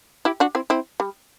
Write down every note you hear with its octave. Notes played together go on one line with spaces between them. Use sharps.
E4 G4
D4 F#4
C4 E4
C4 E4
G3